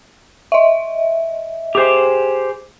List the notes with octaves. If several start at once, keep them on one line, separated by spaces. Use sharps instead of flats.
D#5 E5
G4 G#4 C5